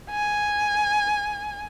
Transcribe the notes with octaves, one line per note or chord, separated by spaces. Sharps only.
G#5